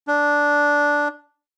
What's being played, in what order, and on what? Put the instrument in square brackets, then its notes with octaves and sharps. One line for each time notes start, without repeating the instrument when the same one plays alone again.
[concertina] D4